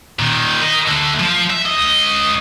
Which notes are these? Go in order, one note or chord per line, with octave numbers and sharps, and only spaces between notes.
A#2 D#3
A#4 D#5
D3 A3
F3
E5
C#2 D#5